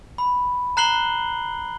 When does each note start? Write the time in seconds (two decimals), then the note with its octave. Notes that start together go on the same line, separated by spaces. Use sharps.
0.18 B5
0.77 A#5 F#6 C7 F#7 G7